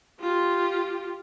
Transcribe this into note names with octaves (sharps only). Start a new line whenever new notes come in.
F4 G4